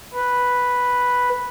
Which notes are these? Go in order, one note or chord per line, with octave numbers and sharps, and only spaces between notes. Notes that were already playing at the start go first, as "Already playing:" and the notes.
B4